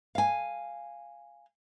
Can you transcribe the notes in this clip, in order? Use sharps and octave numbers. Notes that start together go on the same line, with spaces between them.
F5 G#5